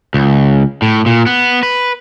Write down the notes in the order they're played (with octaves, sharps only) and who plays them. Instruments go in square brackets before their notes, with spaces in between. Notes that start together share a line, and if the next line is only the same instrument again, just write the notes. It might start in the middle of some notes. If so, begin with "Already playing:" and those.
[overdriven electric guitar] C#2
A2
A#2
B3
B4